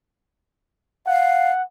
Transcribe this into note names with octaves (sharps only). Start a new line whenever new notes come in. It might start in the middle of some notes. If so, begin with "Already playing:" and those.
F5 F#5